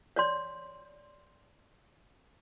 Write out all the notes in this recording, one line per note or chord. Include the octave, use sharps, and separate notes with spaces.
C#5 D5 C6